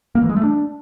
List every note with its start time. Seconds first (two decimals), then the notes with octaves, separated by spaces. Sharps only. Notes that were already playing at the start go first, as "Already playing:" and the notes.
0.15 A#3
0.22 E3
0.29 G#3
0.36 A3
0.43 D4